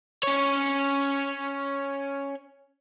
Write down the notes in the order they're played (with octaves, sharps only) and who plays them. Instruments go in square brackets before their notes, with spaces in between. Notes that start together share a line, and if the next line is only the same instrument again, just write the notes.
[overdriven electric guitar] C#4 C#5